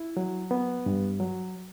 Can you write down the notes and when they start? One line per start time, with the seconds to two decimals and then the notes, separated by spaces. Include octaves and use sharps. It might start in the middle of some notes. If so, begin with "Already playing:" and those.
Already playing: E4
0.17 F#3
0.51 B3
0.86 G2
1.20 F#3